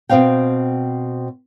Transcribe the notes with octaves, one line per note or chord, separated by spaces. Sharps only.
B2 B3 C4 F5 G5